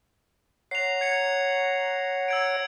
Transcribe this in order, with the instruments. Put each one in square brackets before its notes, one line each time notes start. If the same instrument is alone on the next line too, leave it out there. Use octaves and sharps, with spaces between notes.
[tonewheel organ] C#5 F#5 A#5 [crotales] C7 F7
[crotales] G#6 C#7 F7
E6 G#6 D7